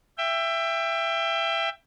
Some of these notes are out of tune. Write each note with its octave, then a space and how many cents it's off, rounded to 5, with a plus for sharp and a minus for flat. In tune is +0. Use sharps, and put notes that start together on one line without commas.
E5 +20 G5 +20